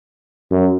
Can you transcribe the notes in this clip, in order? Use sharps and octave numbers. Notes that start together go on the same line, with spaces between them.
F#2